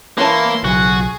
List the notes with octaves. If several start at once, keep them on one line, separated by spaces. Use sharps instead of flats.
E3 A#3 C#4 E4 A5 C6
B1 C#3 F#3 F#4 G#4